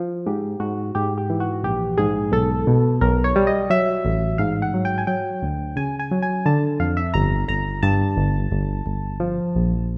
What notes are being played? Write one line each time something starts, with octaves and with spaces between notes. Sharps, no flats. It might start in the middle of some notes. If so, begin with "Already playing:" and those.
Already playing: F3
G#2 G4
G#2 F#4
G#2 G4
G4
E3
F#4
A#1 G4
G#2 G#4
B1 A4
B2
B1 A#4
C#5
G3
D#5
F#3 E5
A1
G#2 F5
F#5
F#3
G5
G#5
F#3 G5
D2
C#3 G#5
G#5
F#3
G#5
D3 A5
F2 F5
E5
G1 A#5
G1 A#5
G2 A5
G1
G1
G1
F3
A#1